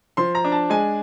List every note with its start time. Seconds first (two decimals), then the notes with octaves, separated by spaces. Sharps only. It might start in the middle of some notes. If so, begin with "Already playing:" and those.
0.17 F3 C6
0.35 A#5
0.45 D4
0.52 A5
0.70 G#3 G#5